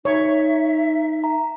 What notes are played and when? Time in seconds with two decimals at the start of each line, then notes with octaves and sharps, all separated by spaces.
0.05 D#4 C#5 E5
1.24 A#5